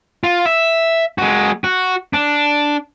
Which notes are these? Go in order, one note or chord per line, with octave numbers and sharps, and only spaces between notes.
F4
E5
G#3 F#4
F#4
D4